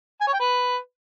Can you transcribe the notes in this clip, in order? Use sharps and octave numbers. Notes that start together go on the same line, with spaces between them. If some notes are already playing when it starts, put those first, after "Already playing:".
G#5
C#5
G5
B4